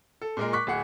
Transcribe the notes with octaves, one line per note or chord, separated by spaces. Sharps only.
A4
A#2 G#3 A#4
C#6 D6 F#6 B6
D1 G#4 F#5